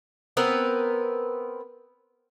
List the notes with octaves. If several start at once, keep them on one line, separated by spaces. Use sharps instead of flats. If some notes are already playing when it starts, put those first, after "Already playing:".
B3 C4 A#4 B4